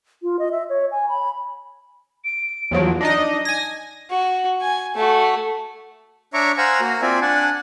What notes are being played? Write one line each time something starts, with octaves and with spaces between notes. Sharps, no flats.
F4
D#5
E5
C#5
G#5
B5
D7
E2 F3 F#3
D4 D#4 D#5 A#6
G#5 G#6 A#6
F#4
G#5
A3 F#4
D4 C#5 E5 A#5 C#6 D6
C5 F5 F#5 G#5 A#5 E6
A#3 F#4 A#4
C4 F4 D5 E5 G#5
D4 F#5 G#5 A5